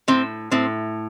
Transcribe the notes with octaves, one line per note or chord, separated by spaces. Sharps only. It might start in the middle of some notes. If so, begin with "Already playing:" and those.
A2 C4
A2 C4